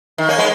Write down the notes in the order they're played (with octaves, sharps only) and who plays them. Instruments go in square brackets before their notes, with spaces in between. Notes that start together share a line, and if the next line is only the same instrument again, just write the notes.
[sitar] D#3
A#3 C#4
G#3 B3